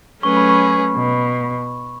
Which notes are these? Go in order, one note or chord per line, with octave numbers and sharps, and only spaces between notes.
F#3 A3 C#4 G#4 B4 C#6
B5
C#6
B2